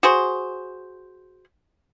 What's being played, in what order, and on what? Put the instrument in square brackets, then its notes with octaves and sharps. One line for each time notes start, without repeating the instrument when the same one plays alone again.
[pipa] F#4 G#4 C5